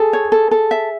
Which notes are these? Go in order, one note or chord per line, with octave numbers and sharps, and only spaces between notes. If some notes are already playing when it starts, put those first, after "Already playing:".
Already playing: G#4 A4
C#5
A4
A4
E5